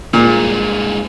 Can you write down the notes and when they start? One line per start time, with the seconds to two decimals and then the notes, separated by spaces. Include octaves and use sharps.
0.14 G2 A#2 G#3